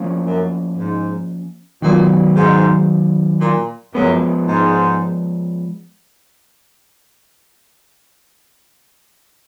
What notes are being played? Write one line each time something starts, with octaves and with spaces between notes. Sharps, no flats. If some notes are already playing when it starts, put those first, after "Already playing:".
Already playing: F3 A#3 C#4
F#2
G#2
A#2 D#3 F#3 B3
G#2
A#2
F#2 F3 G#3 B3
G#2